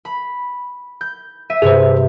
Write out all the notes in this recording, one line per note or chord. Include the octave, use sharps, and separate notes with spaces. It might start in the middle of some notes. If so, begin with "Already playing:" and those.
B5
G6
E5 D#7
G2 C3 G#4 C5